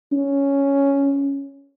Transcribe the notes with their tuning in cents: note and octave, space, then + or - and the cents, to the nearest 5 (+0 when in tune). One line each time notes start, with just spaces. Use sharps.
C#4 +5